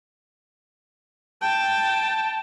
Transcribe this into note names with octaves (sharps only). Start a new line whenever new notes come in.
G5 A5